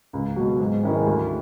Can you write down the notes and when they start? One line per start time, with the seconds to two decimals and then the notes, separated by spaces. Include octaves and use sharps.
0.13 C#2
0.36 B2 F#3
0.59 G#2
0.83 D#3 G#3 C#4 E4
1.06 D2